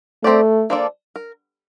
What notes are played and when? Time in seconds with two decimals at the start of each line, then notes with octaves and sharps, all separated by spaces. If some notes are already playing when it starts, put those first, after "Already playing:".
0.24 A3 C4 G4 D5
0.70 F3 A#3 D4 A4 D5
1.16 A#4